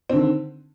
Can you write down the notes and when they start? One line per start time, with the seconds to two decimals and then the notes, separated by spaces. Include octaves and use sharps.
0.10 C4
0.13 D3
0.16 D#3